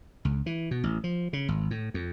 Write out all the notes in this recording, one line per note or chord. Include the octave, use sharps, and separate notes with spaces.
C#2
E3
B2
A1
F3
C#3
G#1
A2
F2